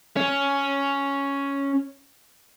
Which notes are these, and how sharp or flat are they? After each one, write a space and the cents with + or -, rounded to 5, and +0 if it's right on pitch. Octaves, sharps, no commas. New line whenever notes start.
C#4 +5